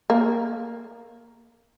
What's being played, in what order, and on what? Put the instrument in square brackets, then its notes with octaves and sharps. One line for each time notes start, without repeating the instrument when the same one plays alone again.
[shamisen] A#3